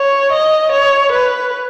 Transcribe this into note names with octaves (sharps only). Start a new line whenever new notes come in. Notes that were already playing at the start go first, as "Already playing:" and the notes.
Already playing: C#5
D#5
C#5
B4